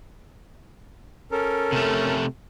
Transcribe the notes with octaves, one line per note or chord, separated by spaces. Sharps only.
C#4 A4 A#4
C3 A3